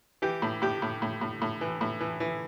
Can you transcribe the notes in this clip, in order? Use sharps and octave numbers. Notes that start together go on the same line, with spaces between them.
E3 G4
A2
A2 G4
A2
A2
A2
A2
E3
A2
E3
E3